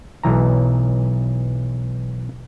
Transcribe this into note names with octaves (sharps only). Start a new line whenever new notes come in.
B1 E3 A#5